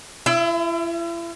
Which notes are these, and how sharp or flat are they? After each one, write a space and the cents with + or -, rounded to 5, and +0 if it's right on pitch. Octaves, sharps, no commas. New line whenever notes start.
E4 +40 E5 +0